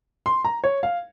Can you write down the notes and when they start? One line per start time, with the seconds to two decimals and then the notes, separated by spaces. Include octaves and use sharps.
0.26 C6
0.45 A#5
0.64 C#5
0.83 F5